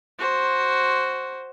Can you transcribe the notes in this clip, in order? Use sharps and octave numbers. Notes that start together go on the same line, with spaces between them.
F#4 C5